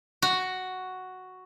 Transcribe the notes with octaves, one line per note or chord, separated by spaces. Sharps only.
F#4